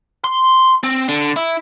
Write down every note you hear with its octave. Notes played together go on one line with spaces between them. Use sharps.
C6
C4
D3
E4